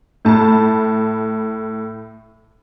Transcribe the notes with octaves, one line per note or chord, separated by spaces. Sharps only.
A2 A5 B5